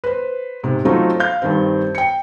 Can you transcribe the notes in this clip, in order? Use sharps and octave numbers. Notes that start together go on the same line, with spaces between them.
B4 C5
G#2 C3
F#3 A3 C4 D#4 F4
F5 G6
G2 D#3 C4
G5 C#7